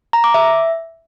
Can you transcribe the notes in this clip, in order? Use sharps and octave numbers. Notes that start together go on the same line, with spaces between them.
A#5
D6
E5